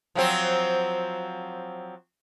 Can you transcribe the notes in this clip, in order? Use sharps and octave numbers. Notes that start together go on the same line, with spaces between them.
F3 F#3 C4